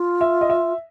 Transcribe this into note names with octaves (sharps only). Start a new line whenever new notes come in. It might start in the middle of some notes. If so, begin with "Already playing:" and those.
Already playing: F4
E5
D#5
E5